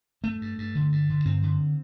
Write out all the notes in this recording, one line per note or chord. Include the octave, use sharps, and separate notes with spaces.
G2 A3
G2
G2
D3
G2
D3
G2 C4
D3